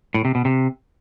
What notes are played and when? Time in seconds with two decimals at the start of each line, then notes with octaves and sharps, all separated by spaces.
0.14 A2
0.25 C3
0.35 B2
0.45 C3